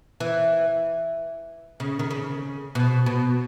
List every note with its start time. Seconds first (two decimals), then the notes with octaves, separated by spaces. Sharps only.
0.20 E3
1.80 C#3
1.99 D#3
2.11 C#3
2.75 B2
3.06 B2